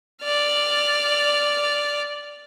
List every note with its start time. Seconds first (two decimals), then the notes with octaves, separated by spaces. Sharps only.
0.22 D5 F6